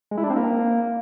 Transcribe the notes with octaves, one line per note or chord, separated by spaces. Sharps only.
G#3
E4
D4
C4
A#3